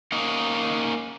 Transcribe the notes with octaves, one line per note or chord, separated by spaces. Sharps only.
A#3 C#4 D#4